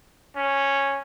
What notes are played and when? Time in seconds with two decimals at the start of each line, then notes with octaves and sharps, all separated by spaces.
0.36 C#4